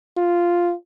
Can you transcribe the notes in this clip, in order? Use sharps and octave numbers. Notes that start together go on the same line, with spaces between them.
F4